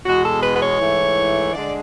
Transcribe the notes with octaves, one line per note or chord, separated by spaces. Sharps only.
E2 B2 G#3 F#4
A4
B4
B4
C#5
G#2 E3 A3 E4
D3 G#3 D4 D5